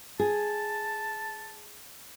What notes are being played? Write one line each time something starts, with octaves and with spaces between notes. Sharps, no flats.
G#4 A5